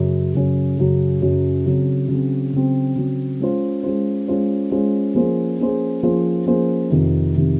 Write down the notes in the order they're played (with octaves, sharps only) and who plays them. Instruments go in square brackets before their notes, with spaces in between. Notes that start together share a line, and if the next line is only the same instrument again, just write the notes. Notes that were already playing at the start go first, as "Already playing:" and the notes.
Already playing: [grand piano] F#2 C#3 F#3 C#4
F#2 C#3 F#3 C#4
F#2 C#3 F#3 C#4
F#2 C#3 F#3 C#4
C#3 F#3 C4
C#3 F#3 C4
C#3 F#3 C4
C#3 F#3 C4
G#3 C#4 F4 C5
G#3 C#4 F4 C5
G#3 C#4 F4 C5
G#3 C#4 F4 C5
F3 A#3 C#4 G#4 C5
F3 A#3 C#4 G#4 C5
F3 A#3 C#4 G#4 C5
F3 A#3 C#4 G#4 C5
F2 C3 D#3
F2 C3 D#3